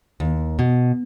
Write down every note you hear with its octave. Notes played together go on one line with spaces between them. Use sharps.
D#2
B2